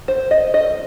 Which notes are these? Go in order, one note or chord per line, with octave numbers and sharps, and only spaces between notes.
C5
D#5
D#5